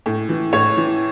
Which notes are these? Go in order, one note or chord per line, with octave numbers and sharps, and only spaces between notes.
A2
E3
A2 C#5
E3